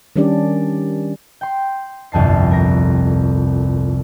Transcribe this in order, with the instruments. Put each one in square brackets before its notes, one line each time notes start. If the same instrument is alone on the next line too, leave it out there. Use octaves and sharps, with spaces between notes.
[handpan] D#3 G3 C#4 D4 G4 D5
[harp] G5 C6
G1 C2 F2 A5 C7
A#4 A#6